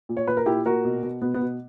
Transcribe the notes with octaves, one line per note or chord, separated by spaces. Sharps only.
A#2
C#5
A#2 B4
A#4
A#2 E4 G4
A#2 F#4 A#4
B2
B2
B2 B3
B3
B2